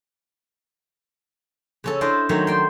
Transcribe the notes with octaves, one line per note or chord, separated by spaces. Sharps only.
C#3 C#4 A4
D4 E4 A4 C5 D5 D#5
D#3 F#3 A3 C#4 C5 C#5
D5 G5 C6